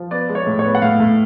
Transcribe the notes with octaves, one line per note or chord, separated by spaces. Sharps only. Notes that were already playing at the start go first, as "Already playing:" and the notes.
Already playing: F3
B3 D5
G#3
C#5
A2
C#5
B3
F#5
A2 F5
A2